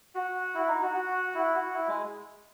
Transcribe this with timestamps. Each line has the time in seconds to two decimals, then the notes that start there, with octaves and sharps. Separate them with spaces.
0.15 F#4
0.55 E4
0.68 D#4
0.82 F#4
0.95 F#4
1.35 E4
1.54 F#4
1.74 E4
1.88 G#3